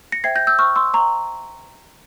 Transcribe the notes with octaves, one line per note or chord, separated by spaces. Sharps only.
A#6 C#7
C5 E5 G5 G#6 C7
G6 A#6
E6 G6
C5 E5 G5 C#6 F6
C6 E6
C5 E5 G5 A#5 C#6